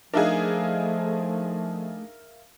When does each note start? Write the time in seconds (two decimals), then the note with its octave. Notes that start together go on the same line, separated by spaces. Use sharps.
0.14 F3 A3 D4 D#4 G#4 A#4 E5 F5